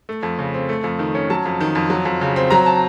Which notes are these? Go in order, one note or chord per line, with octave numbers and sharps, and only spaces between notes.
A3
F2
C#3
C4
A3
F2
D#3
C#4
F#3 A5
F2
D#3
F2
F#3
F2
C#3
C4
F#3 A#5
A5